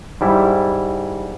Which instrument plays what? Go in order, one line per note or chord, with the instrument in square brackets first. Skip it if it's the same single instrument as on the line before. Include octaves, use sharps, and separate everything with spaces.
[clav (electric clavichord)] G#2 G3 E4